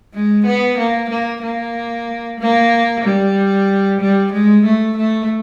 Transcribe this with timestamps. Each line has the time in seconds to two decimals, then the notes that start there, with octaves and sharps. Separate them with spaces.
0.14 G#3
0.46 B3
0.78 A#3
1.10 A#3
1.42 A#3
2.40 A#3
3.04 G3
4.00 G3
4.32 G#3
4.65 A3
4.97 A3